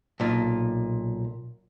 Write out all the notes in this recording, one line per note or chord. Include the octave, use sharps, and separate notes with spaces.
B1 A#2